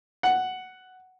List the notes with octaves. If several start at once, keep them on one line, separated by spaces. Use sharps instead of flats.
F#5